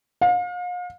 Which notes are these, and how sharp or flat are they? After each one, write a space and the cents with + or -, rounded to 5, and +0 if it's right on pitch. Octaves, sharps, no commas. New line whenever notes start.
F5 +40